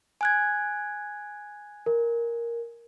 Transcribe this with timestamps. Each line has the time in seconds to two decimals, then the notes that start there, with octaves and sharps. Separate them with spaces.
0.21 G#5 F#6 G#6
1.86 A#4